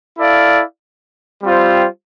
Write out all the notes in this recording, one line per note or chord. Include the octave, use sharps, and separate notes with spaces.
E4 A4 D5 F5
G3 C4 F4 C5